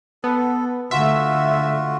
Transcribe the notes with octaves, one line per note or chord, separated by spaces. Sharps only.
B3 A4
D3 A3 F4 F#4 E5